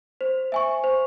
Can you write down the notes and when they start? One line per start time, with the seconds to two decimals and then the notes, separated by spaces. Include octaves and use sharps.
0.21 C5
0.52 E5 G#5 C#6
0.84 C5